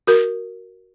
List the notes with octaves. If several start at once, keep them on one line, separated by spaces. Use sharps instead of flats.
F#4 A#4